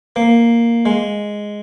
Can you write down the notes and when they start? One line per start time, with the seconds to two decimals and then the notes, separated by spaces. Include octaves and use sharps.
0.16 A#3
0.86 G#3